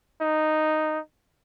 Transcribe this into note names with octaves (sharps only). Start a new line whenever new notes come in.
D#4